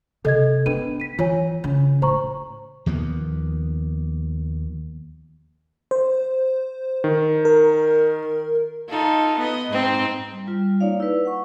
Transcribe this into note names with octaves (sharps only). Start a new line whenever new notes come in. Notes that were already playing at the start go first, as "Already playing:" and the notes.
C3 A4 D#5 G#6
B3 D4 B4 D#7
B6 D#7
E3 F4 C#5 G#5
C#3
A2 C5 A#5 C#6
D#2 F3 A#3 B3
C5
D#3
A#4
D#4 F4 A4
B3 D#5
G#2 C4 D#4
G3
G3 F4
A#3 D#4 C#5 D5 F5
E4 B4
F#5 C#6